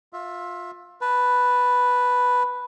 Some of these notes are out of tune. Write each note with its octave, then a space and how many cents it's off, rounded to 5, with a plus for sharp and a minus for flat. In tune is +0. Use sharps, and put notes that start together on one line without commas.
F4 +20 E5 +0
B4 +0 A5 +0